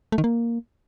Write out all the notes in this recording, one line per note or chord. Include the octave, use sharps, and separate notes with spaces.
A3
D#3
A#3